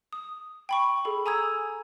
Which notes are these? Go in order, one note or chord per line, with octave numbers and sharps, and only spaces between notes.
D#6
G5 B5 C#6
G#4 A4 B5
G#5 A#5 D#6 E6 G#6